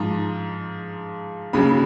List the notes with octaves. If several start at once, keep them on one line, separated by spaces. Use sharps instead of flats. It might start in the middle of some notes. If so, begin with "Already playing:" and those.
Already playing: G#2 F3 A#5
D#2 C#3 F#3 B5